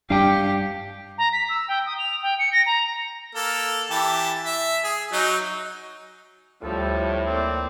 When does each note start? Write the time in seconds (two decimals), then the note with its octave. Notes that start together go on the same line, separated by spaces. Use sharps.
0.10 G2 G3 D4 G4 F5 G5
1.18 A#5
1.32 B6
1.49 E6
1.68 G5
1.86 D#6
1.98 F7
2.22 G5
2.39 C#7
2.52 A#6
2.66 A#5
3.35 A#3 A4
3.90 E3 G4 A5
4.46 E5
4.84 G#4
5.12 F#3 D#4
6.63 D2 A2 F3 G3 A4
7.26 A#3 C4 D5